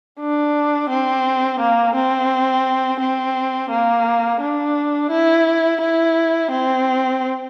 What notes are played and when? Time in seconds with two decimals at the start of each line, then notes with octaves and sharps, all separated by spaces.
0.20 D4
0.90 C4
1.60 A#3
1.95 C4
3.00 C4
3.71 A#3
4.40 D4
5.10 E4
5.81 E4
6.51 C4